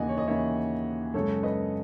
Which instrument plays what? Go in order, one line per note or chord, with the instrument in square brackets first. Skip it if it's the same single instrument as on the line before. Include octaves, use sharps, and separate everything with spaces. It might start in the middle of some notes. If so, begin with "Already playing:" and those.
Already playing: [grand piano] D#2 C#3 E3 D#5 F#5 G#5
C#5
D#5
D#2 C#3 E3 C#5 E5
F#2 C#3 G#3 A4 C#5
B4 D#5